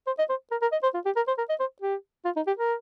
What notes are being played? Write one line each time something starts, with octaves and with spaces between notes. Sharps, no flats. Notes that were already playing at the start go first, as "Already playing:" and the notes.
C5
D#5
C5
A#4
A#4
D#5
C5
F4
G4
A#4
C5
A#4
D#5
C5
G4
F4
D#4
G4
A#4